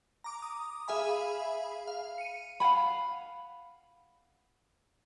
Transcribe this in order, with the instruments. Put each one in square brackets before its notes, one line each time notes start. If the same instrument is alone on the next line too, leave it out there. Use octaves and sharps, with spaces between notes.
[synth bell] A#5 D6
D#6
G#4 E5 F5 G#5 B5
F5
C#7 D#7
[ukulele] F5 F#5 G#5 B5